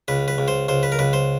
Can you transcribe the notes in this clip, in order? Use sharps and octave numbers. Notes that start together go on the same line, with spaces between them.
C#2 B4
B4
C#2
C5
C#2 C5
B4
A#4
C#2 B4
C5